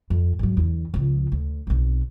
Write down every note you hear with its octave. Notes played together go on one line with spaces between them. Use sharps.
F2
G#2 F#3
E2 D3
C#2 F3
D2
B1 C4